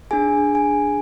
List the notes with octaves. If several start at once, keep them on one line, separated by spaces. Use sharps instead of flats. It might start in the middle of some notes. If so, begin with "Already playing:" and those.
D4 G#4 G#5
G#5